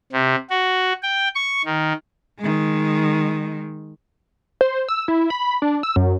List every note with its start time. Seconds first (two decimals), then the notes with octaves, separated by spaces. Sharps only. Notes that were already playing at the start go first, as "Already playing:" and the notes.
0.13 C3
0.50 F#4
1.03 G5
1.35 C#6
1.65 D#3
2.39 D#3 G#3
4.61 C5
4.89 E6
5.08 E4
5.30 B5
5.62 D4
5.83 E6
5.96 F#2